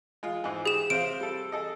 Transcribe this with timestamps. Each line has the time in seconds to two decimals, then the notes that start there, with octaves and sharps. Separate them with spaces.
0.23 G#3 F4
0.44 G#2 E3
0.66 G4 G#4 E7
0.90 C3 C5 F5 D7
1.20 G3 A4
1.52 G#4 A4 D#5